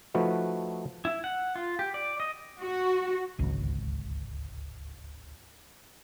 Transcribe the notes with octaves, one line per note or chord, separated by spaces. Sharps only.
F3 A3 D#4 F#4 B4
E4
F#5
F4
G4
D5
D#5
F#4
D1 G#1 C#2